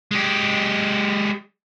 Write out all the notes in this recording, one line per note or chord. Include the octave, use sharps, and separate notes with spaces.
G#3 G4